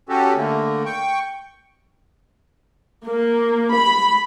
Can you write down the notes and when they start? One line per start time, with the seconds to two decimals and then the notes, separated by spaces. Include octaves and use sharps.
0.09 C#4 F#4 G4 A4
0.36 D3 A3 A#3
0.86 G5 C#6
3.05 A#3
3.73 B5